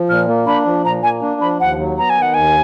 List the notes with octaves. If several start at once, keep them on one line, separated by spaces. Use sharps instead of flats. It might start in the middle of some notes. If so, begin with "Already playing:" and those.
Already playing: F3
A#2 F6
A#3
D4 B5
F3
A#2 A#5
A#3 G#5
D4
F3 B5
D#2 F#5
F#3
B3 A#5
G#5
D#3
F#5
D#2 G#5